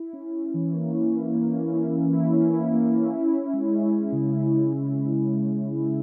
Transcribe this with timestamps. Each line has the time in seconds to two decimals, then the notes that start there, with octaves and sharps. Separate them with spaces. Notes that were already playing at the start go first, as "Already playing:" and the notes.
Already playing: E4
0.13 C#4
0.34 C#4
0.54 E3
0.73 A#3
0.94 C#4
1.13 E4
1.34 A#3
1.53 C#4
1.74 E4
1.93 C#4
2.13 E4
2.32 C#4
2.52 E4
2.73 A#3
2.92 C#4
3.13 E4
3.33 C#4
3.53 G#3
3.72 C#4
3.93 C#4
4.12 C#3
4.33 G#3
4.53 G#3
4.73 E4
4.93 C#3
5.12 C#3
5.32 G#3
5.53 C#4
5.72 E4